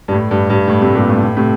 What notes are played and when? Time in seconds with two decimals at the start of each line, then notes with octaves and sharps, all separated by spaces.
0.08 G2
0.13 A2
0.31 G2
0.50 G2
0.68 A2
0.82 A2 C3
0.95 G2 A#2
1.10 A2
1.23 A2
1.37 A2 C3